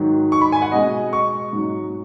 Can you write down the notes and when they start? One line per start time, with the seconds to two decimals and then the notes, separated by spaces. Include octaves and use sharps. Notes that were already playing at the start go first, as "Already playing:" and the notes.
Already playing: G#2 D#3 F#3
0.32 C#6
0.41 B5
0.52 G#5
0.62 F#5
0.72 B2 G#3 D#5
1.13 C#6
1.53 G#2 F#3